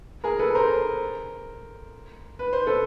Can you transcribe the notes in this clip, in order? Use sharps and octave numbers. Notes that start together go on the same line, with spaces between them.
G#4 A#4
A4 B4
A#4 C5
B4
C5
A4 B4